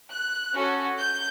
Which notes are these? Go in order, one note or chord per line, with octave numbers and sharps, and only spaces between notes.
F#6
C#4 F#4 A4
G6